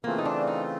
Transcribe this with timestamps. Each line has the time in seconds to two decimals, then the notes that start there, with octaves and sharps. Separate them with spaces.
0.04 C#3 E3 A3 A#3 C4 F4
0.18 D#4
0.25 D4
0.47 D#4